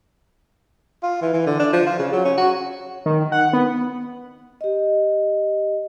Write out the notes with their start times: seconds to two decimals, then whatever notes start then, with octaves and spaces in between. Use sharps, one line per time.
1.03 F4
1.22 E3
1.33 E3
1.46 D3
1.59 D4
1.73 F3
1.86 F4
1.99 C#3
2.13 F#3
2.25 C#4
2.38 F#4
3.06 D#3
3.32 F#5
3.53 B3
4.61 G4 D#5